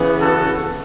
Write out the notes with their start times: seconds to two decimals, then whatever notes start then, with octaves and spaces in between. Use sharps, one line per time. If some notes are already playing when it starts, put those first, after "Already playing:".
Already playing: C#3 E3 B3
0.20 F#4 A4